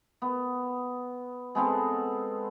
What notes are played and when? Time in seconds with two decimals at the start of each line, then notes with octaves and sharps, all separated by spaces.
0.22 B3
1.55 G#3 B3 C4 A4